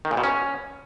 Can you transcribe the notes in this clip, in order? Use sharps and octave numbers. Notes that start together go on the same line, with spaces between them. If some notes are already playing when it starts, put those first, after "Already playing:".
D#3
A#2
B2
C#4